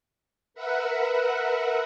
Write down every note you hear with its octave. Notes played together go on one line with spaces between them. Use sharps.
A#4 B4 E5 F#5